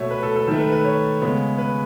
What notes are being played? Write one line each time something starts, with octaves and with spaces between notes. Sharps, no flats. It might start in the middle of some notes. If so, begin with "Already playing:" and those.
Already playing: B2 A3 C#5 E5
B4
A4
A4
D#3 A3 A4
B4
B4
C#5
C#3 G#3 B3
B4